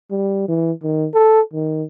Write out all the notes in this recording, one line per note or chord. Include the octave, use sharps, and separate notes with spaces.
G3
E3
D#3
A4
D#3